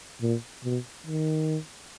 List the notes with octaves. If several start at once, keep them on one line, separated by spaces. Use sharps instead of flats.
A#2
B2
D#3